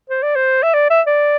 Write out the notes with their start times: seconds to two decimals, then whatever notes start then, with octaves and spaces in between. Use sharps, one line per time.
0.10 C5
0.23 D5
0.36 C5
0.63 E5
0.74 D5
0.90 E5
1.07 D5